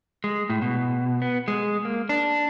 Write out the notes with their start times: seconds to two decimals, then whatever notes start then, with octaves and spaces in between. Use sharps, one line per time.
0.24 G#3
0.50 A2
0.62 B2
1.22 B3
1.48 G#3
1.85 A#3
2.09 D4